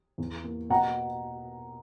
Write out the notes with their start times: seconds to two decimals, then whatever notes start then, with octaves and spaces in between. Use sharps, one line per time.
0.18 E2
0.44 A#3
0.70 B2 F#5 A#5